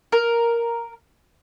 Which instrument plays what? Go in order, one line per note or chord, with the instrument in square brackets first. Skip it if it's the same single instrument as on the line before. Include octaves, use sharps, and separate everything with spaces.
[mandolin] A#4